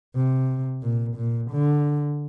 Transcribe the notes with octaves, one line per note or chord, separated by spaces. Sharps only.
C3
A#2
A#2
D3